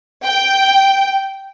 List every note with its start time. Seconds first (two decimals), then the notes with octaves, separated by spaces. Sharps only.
0.23 G5